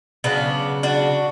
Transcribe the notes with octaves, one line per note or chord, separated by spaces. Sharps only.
C#3 F#3 B3 D4
D4 F#4